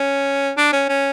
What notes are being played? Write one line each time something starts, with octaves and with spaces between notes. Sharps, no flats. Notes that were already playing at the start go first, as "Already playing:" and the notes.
Already playing: C#4
D4
C#4
C#4